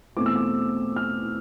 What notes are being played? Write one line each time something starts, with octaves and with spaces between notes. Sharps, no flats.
E2 B2 A3 C4 D6
E6
D6
F6